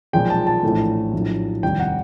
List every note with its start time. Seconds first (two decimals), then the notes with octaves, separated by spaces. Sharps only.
0.13 B1 A#2 F3 G#3 G5
0.30 A5
0.47 A5
0.63 A#1 A2 E3 A3
1.13 A#1 A2 F#3 A3
1.63 F1 D#2 D#3 G3 G5
1.80 F#5